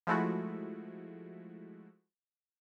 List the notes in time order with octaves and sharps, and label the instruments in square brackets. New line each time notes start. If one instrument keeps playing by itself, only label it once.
[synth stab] F3 G#3 A3 E4 F#4